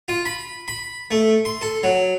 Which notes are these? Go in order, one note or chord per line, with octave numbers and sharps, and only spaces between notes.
F4
B5
B5
A3
C6
A4
F#3